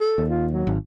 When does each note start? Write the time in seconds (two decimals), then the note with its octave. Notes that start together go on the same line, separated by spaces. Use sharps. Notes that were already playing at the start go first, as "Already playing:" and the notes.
0.01 A4
0.18 D#2
0.30 F4
0.52 F#3
0.67 G#1